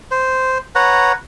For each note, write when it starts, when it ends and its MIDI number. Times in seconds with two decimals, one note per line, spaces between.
0.11 0.58 72
0.75 1.12 71
0.75 1.12 73
0.75 1.12 78
0.75 1.12 82